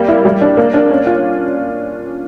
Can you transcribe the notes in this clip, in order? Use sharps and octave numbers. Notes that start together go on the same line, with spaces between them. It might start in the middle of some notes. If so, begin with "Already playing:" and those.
Already playing: G3 A#3
E4
G3
D4
A#3
D4
C#4
F4